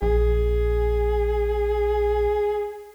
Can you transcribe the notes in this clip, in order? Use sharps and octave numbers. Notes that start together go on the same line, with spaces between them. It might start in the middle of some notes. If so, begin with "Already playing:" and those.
A#1 G#4